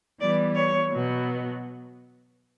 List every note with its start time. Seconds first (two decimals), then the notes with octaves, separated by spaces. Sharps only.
0.20 E3 G3 B3 D5
0.55 C#5
0.91 B2 F#3 B3